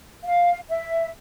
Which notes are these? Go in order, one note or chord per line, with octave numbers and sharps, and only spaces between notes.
F5
E5